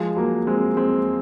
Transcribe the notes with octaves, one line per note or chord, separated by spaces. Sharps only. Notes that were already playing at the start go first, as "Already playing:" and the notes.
Already playing: F3 G#3
F#3 A#3
G#3 C4
G#3 C4